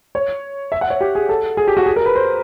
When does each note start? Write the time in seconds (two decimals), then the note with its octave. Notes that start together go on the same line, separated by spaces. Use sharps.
0.15 C#5
0.72 E5
0.81 F#5
0.90 C#5
1.01 G4
1.15 G#4
1.29 A4
1.57 G#4
1.68 G4
1.77 F#4
1.86 G#4
1.96 A#4
2.06 B4
2.16 C5